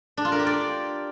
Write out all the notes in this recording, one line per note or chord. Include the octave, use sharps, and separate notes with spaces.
D4
F4
A#4
G4
D5